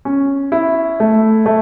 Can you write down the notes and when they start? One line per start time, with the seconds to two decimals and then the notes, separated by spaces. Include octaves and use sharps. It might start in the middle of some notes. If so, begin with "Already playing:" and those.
0.05 C#4
0.52 E4
1.00 A3
1.46 A3